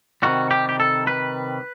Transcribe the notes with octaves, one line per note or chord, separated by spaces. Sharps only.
C3 D#3 G3 F#4
G4
G4
A4
B4